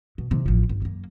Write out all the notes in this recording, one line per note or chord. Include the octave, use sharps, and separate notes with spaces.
B2
C3 D#3
A1 F3
G1
F#2 A#3